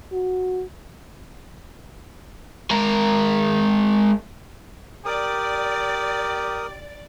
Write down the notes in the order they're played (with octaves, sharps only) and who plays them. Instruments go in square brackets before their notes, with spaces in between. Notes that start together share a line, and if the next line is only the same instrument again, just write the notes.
[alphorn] F#4
[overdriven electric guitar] G#3 A#4
[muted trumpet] G4 [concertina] A#4 D#6 [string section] D5